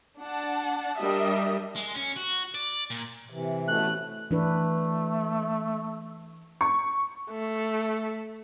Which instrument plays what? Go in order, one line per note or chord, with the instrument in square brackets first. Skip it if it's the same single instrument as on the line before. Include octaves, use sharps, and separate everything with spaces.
[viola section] D4 F#5 A5
G3 D4 A#4 D#5 E5
[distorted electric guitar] G#3
C#4
F#4
D5
A#2
[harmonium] C3 E3
[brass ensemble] A1 B2 A3 [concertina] F#6
[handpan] E3 D4 B4 [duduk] A3
[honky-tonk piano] C#6
[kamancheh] A3